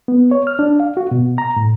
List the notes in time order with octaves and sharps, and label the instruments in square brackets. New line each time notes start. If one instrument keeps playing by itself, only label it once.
[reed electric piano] B3
C#5
F6
D4
F5
F#4
B2
A#5
A2